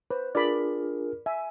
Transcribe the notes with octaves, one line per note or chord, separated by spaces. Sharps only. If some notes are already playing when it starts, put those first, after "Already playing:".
B4 C5
D4 F4 G#4 A#4 D5 B5
E5 G#5